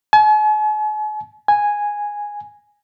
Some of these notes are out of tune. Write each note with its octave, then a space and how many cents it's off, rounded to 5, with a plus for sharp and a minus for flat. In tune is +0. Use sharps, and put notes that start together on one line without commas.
G#5 +45
G#5 -5